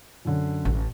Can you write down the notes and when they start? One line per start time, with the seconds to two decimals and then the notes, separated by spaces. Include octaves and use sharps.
0.25 F#2 D3
0.65 A1